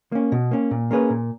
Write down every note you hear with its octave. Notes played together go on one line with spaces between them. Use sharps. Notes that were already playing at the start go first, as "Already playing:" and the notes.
A#3 C#4
B2
A#3 C#4
A#2
A#3 C#4 G#4 B4
A#2